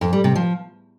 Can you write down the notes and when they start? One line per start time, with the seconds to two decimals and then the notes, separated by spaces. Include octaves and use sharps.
0.01 F2
0.13 G3
0.24 C3
0.36 F3